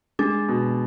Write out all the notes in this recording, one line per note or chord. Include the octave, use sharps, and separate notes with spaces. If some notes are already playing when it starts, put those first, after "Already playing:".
G#3 D4
B2